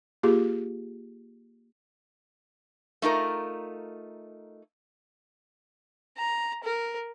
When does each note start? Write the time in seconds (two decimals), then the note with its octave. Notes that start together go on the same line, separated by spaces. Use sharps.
0.23 A#3 F4 G4 G#4
3.02 A3 D#4 F4 A#4
6.18 A#5
6.64 A#4